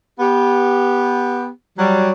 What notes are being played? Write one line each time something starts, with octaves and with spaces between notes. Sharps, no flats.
B3 G4
F#3 G3